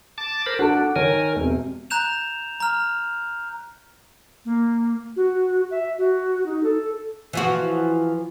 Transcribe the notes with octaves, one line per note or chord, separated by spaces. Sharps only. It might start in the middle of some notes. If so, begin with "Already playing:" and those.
A5 D6 A6
A#4 C5 B5
D4 F#4 A4 A5
D#3 A#4 C#5 G#5
E1 C3
A#5 F#6 G6 E7 F7
A#5 F6
A#3
F#4
E5
F#4
D#4
A4
E3 F3 F#4